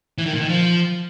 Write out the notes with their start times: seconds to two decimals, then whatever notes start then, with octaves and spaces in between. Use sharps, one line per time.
0.18 E3
0.26 D#3
0.33 A#2
0.41 D#3
0.49 F3